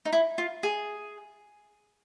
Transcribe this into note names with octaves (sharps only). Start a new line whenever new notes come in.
D#4
E4
F4
G#4